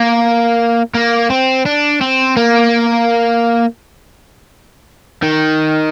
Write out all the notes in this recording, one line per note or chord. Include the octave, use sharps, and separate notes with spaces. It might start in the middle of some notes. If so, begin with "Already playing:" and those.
Already playing: A#3
A#3
C4
D4
C4
A#3
D#3